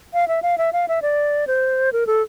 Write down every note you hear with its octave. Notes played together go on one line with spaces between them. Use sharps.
F5
E5
F5
E5
F5
E5
D5
C5
A#4
A4